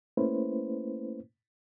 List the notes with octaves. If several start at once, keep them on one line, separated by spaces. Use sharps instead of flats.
A3 A#3 C#4 E4 B4 C5